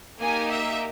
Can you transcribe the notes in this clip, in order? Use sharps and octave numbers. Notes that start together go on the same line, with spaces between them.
A#3 D#4 G4 G#5
E5